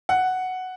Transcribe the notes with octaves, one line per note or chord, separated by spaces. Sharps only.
F#5